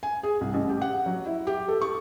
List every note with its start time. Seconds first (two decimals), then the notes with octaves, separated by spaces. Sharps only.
0.03 G#5
0.23 G#4
0.41 C2
0.54 A1
0.69 G4
0.82 F#5
1.06 F#3
1.26 E4
1.47 G4
1.68 A4
1.82 C#6